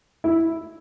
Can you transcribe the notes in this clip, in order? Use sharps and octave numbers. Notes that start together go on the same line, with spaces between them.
E4